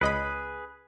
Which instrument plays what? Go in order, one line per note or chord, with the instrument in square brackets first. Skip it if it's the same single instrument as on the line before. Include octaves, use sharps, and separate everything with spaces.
[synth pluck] C#2 D#5 B5 [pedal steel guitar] G#4 B4